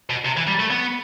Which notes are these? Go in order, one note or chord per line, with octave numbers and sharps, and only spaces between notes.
B2
C3
E3
G3
A3
B3